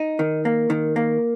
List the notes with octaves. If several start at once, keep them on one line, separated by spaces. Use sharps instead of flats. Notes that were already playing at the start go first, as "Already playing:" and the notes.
Already playing: D#4
D#3
A#3
D#3
A#3